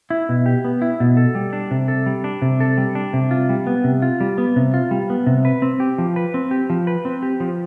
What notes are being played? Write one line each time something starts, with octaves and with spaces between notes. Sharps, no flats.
E4
B2
G4
B3
E4
B2
A4
G3
D4
C3
A4
G3
D4
C3
A4
G3
D4
C3
F4
G3
B3
C3
F4
G3
B3
C3
F4
G3
B3
C3
B4
C4
G4
F3
B4
C4
G4
F3
B4
C4
G4
F3